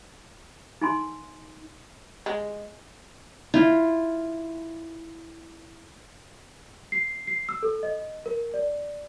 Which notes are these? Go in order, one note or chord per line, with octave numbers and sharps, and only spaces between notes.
D#4 G#5 C6
G#3
E4 F4
C7
C7
E6
A4
D#5
A#4
D5